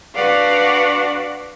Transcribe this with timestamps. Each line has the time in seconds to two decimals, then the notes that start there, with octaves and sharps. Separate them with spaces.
0.15 D4 F#4 B4 D5 F5 F#5